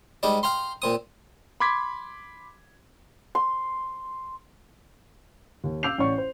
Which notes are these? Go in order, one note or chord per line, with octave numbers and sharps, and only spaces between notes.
G#2 G3 D#4 D5
F5 G5 A#5 C6
A#2 C4 D#6
B5 C6 D6 G#6 B6
C6
D#2
F5 D6 E6 G6 C7 F7
A1 C#5 D5 C#6
C5